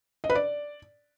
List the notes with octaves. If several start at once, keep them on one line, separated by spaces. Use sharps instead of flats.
D#5
B4
D5